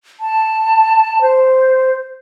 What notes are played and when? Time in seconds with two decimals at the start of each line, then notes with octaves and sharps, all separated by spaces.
0.20 A5
1.21 C5